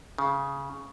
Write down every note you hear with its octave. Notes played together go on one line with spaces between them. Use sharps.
C#3